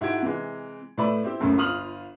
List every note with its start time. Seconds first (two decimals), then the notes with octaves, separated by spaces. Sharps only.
0.01 G#2 E4 F#4 G4 G#6 D7
0.22 C3 E3 G#3
0.98 A2 A3 B4 D5 E5 B5
1.24 C4 E4 G4
1.40 F#1 C#2 F#2 A2
1.57 G1 F4 D#6 F6 F#7